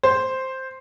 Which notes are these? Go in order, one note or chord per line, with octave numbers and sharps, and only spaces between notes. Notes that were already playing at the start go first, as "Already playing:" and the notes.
C5